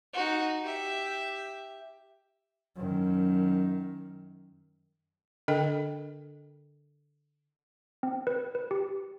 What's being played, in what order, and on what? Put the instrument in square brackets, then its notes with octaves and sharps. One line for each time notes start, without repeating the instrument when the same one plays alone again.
[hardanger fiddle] D#4 F#4
G4 E5
[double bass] F#2 D#3
[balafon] D3 D4 A4 A#4 D#5 G5
[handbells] C4
B4
B4
G4